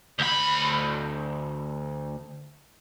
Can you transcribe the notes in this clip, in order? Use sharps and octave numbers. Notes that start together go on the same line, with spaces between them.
D2 B5